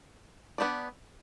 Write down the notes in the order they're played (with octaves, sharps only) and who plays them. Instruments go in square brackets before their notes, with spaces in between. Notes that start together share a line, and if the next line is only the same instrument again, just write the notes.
[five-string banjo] B3 D4 G4 D5